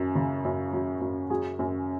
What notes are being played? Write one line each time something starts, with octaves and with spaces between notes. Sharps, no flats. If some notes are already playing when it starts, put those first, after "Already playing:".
Already playing: F#2
C#3
F#2
F#3
F#2
F#3 G#4
F#2